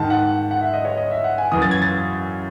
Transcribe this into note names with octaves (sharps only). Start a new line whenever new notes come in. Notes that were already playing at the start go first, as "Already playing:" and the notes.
Already playing: G#2 D#3 A5
F#5
F#5
E5
D#5
C#5
D#5
E5
F#5
G#5
F#2 E3 D#6
A6
G#6
A6